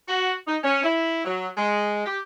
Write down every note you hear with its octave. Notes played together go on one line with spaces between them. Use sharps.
F#4
D#4
C#4
E4
F#3
G#3
G4